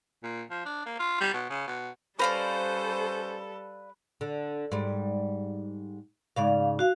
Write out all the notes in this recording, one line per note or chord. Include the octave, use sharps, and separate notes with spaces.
A#2
F3
D4
A#3
F4
G3
B2
C#3
B2
G3 C#4 A4 B4 C5 D5 F5 A#5
D3
G#2 G3
G#2 C#3 D5 F5
F#4 F5